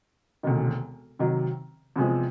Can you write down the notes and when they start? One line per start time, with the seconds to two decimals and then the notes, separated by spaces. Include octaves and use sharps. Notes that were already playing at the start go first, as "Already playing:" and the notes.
0.43 E1 D2 C3 D#3
1.19 C3 D#3 F#3
1.96 E2 C3 F3 G#3